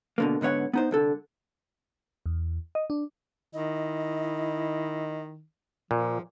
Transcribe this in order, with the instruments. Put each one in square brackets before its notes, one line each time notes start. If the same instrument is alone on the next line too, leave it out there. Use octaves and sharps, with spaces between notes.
[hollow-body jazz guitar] B2 D3 A#3
G#2 D3 B3 C#5 F#5
B3 D#4 C5
C2 D3 A4
[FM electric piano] E2
D#5
D4
[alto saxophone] D#3 [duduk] E4 [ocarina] D#5
[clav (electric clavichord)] A#2 [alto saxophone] F3